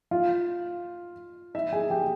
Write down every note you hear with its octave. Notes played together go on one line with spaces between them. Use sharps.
F4 F5
E4 E5
G#4 G#5
G4 G5